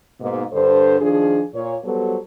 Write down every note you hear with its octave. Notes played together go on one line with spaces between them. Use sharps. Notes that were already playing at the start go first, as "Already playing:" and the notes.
G#2 B2 A#3
G2 D3 A4 C5
D#3 F3 D4 G#4
A#2 C#5
F#3 G3 B3 F#4 A4 C5